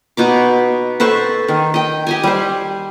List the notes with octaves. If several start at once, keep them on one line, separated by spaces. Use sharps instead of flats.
B2 D#4 D6
A4 B4 C5 C#6
D#3
D#5 G5
G4 D#5 G#5
G3 C5